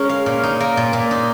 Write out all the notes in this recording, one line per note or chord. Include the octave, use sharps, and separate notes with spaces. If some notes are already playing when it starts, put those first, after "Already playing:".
Already playing: G#3 C#4 A#4
F5
A#2
D#4
A#3
A#2
A#2
D#4